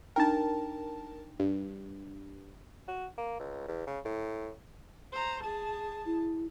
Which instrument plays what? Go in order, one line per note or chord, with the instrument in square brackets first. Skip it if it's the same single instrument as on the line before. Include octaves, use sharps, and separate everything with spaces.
[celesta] D4 D#4 G5 [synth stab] A#4 A5
[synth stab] G2
[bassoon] F#4
A#3
C#2
E2
C#3
A2
[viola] C5 A#5
G#4 A5
[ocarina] E4